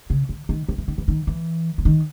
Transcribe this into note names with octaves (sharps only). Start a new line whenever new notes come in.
C#3
D3
D#3
D#3
E3
D#3
E3
D#3
E3
E3
D#3